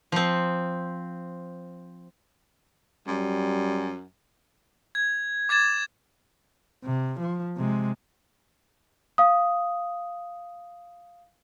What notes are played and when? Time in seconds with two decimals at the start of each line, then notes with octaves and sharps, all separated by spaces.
0.12 F3 C4
3.07 F#2 G3
4.95 G#6
5.49 D6 G#6 A6 E7
6.84 C3
7.20 F3
7.57 C3 G#3
9.18 F5 D#6